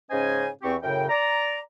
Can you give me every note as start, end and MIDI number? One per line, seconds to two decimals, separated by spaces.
0.11 0.48 44
0.11 0.48 49
0.11 0.48 61
0.11 0.48 72
0.11 0.48 75
0.11 0.48 80
0.62 0.75 40
0.62 0.75 60
0.62 0.75 67
0.62 0.75 85
0.83 1.05 42
0.83 1.05 45
0.83 1.05 49
0.83 1.05 70
0.83 1.05 79
1.09 1.58 74
1.09 1.58 82